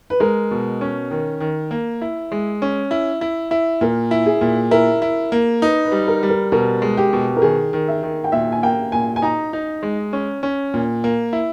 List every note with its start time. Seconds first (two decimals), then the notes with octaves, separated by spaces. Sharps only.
0.10 B4
0.20 G#3 A#4
0.51 B2
0.81 C#4
1.11 D#3
1.40 D#3
1.71 A#3
2.02 E4
2.32 G#3
2.62 C#4
2.91 E4
3.21 E4
3.51 E4
3.81 A#2 A#4
4.11 E4
4.26 G#4
4.41 A#2
4.71 E4 A#4
5.02 E4
5.32 A#3
5.62 D#4 B4
5.85 B4
5.92 G3
6.08 A#4
6.23 G3
6.29 A#4
6.52 B2 A#4
6.82 G#3
6.97 G4
7.13 B2
7.37 A#4
7.42 D#3 G#4
7.73 D#3
7.88 E5
8.03 D#3
8.24 G5
8.32 A#2 E5
8.52 G#5
8.63 A#3 G5
8.92 A#2 G#5
9.16 G#5
9.22 D#4 A#5
9.53 D#4
9.83 G#3
10.13 C#4
10.43 C#4
10.74 A#2
11.04 A#3
11.33 E4